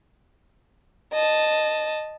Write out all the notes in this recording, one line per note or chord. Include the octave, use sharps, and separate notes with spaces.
D#5 A5